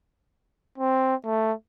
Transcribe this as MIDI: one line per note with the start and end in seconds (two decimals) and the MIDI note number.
0.78 1.15 60
1.25 1.53 57